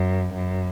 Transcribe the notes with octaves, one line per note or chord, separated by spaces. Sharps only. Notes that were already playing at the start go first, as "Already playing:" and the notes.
Already playing: F#2
F#2